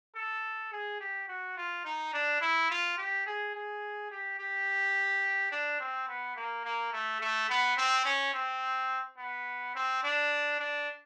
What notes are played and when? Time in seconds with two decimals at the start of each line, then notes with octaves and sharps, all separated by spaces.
0.15 A4
0.72 G#4
1.01 G4
1.28 F#4
1.57 F4
1.85 D#4
2.13 D4
2.41 E4
2.70 F4
2.98 G4
3.26 G#4
3.55 G#4
4.11 G4
4.39 G4
5.52 D4
5.80 C4
6.08 B3
6.36 A#3
6.65 A#3
6.92 A3
7.20 A3
7.49 B3
7.77 C4
8.05 C#4
8.34 C4
9.18 B3
9.75 C4
10.03 D4
10.59 D4